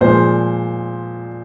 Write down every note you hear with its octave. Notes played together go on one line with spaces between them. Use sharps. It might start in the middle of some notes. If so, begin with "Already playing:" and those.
A#2 F3 G#3 C5